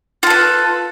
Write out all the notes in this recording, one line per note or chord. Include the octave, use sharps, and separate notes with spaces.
F4 A4 B4